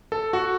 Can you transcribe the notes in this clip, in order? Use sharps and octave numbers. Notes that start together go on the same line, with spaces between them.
A4
F#4